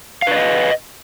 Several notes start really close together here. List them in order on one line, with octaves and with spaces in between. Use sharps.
F5 B4 D5 D#5